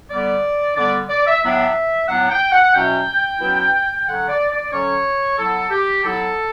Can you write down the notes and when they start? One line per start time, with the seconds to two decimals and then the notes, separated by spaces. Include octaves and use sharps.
0.10 D3 G3 B3 D5
0.75 D3 G3 B3 D5
1.08 D5
1.26 E5
1.42 A2 F#3 B3 D4 E5
2.08 A2 F#3 B3 D4 F#5
2.29 G5
2.51 F#5
2.73 B2 F#3 C#4 E4 G5
3.39 B2 F#3 C#4 E4
4.06 D3 F#3 C#4 F#5
4.27 D5
4.49 D5
4.72 D3 F#3 C#4 C#5
5.38 F#3 B3 E4 A4
5.70 G4
6.03 F#3 B3 E4 A4